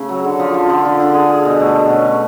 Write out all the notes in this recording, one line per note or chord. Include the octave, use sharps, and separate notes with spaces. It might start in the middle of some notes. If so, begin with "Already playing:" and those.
Already playing: C#3 A3
F#3
D3
F3
F3
D3
D3
D3
G#4
G#4
B2
A3
B2
C#4
A3